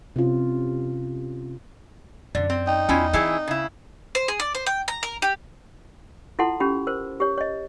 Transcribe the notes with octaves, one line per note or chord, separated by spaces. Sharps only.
C3 C#4 F4
F#2 D3 D5
C4
D#4 G5
E2 C#4 E4 F4
E3 C4 E4 G#4
C#3 E4
C5
G#4
D5
C5
G5
A#5
A#4
G4
E4 F4 A4 F#5 A5 C6
C#4 G4 B5
A#4 C5
G4 C#5
C#5 D#5